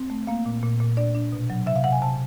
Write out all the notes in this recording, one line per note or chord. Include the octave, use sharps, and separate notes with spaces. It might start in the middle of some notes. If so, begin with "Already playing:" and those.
Already playing: C4
A3
A#3 F5
A#2
A#2
A#2
D4 D5
D4
B2
F#3
C3 E5
F5
C3 F#5
G#5
C3 A5